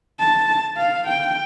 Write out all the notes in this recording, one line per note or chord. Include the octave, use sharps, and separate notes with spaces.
A5
F5
G5